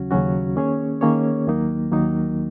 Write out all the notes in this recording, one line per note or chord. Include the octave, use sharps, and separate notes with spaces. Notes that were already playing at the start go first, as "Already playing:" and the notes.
Already playing: D#2 C#3 F#3 C#4 F#4
D#2 C#3 F#3 C#4 F#4
D#3 A#3 C#4 G#4 C#5
D#3 A#3 C#4 G#4 C#5
D#2 D#3 F#3 A#3 D#4
D#2 D#3 F#3 A#3 D#4